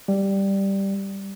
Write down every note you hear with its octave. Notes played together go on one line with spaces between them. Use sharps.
G3